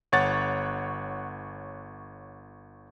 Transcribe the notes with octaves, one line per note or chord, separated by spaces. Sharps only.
G1 C#5 F#5 A6